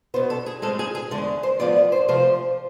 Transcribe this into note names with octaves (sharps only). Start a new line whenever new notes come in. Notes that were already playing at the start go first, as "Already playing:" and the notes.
B2 B3 C5
A4
G#4
A2 G#3 C4 A4
G#4
G#4
E2 D3 G#3 A4
C5
A2 F3 G#3 B3 D5
C5
C3 F3 A3 C5